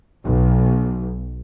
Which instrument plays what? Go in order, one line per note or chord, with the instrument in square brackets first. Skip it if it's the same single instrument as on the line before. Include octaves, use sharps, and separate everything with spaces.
[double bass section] B1